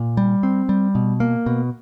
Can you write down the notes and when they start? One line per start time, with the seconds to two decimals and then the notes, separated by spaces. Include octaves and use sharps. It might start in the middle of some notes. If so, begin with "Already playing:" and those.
Already playing: A#2
0.17 G3
0.43 C4
0.69 G3
0.95 B2
1.20 A#3
1.46 B2